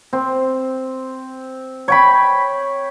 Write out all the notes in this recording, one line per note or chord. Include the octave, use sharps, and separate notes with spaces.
C4
C#5 G5 B5